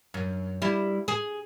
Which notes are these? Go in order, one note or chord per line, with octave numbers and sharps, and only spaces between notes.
F#2
G3 E4
G#4